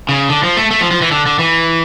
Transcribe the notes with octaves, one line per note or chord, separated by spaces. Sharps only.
C#3
D3
F3
A3
A3
F3
F3
E3
D3
D3
E3